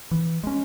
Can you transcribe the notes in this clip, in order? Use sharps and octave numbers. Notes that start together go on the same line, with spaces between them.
E3
G#3 C#4